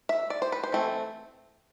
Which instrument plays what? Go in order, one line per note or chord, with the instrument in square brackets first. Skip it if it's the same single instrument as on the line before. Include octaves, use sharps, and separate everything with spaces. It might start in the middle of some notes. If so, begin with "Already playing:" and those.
[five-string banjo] E5
D5
C5
B4
C5
E3 A3 C4